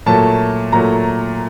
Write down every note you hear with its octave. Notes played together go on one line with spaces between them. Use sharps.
A#2 F#3 A3 A5
A#2 F#3 A3 A#5